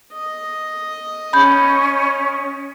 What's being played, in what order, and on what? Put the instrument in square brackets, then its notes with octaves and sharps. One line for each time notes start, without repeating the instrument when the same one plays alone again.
[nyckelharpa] D#5
[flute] C#4 [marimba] B5 G6